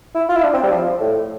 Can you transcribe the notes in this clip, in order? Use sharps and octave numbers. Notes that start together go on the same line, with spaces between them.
E4
F4
E4
D4
C4
G3
F3
A2